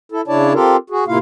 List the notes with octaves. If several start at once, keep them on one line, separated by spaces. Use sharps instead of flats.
E4 A4
C#3 D4 E4 C#5 D5 A5
C4 F4 G4 A4 A#4
F#4 G#4
A2 C3 A#3 E4 F4 F5